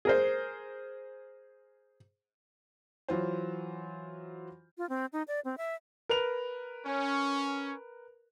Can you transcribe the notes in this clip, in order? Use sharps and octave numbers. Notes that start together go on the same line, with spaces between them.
G#4 A#4 C5
E3 F#3 F4 C5
F4
C4
D#4
D5
C4
E5
A#4 B4 F7
C#4